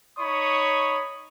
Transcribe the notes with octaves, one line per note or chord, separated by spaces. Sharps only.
D#4 C#5 B5 C#6 D#6